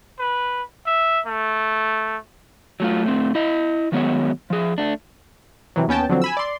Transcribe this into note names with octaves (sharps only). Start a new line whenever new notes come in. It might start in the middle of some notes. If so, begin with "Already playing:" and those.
B4
E5
A3
F#3 A3 F4
A2 A3 C4
E4 D#5
D#3 F#3 G#3 B3 C#5
F3 G#4
A3 D4
C3 E3 F#3
D#2 B3 C#4 G5 A5
D3 F3 F#3 C4
G#5 B5 E6
D5 C6